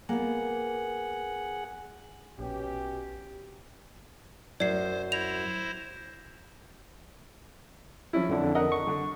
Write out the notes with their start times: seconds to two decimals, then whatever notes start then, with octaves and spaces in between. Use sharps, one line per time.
0.09 A#3 B3 G#4 F#5
2.39 A#1 B2 C#4 G4
4.60 F#2 C5 D5 C7
5.12 E4 C5 A#6 F7
8.13 F3 C#4 E4
8.29 F2 D3 D4
8.55 A#4 D#5 F#5
8.72 C#6
8.87 D3